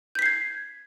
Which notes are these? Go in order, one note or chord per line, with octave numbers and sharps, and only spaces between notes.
G6 G#6 B6 C7